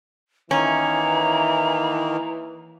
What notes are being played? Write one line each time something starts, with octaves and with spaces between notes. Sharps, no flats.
D#3 E3 A#3 C#4 A#5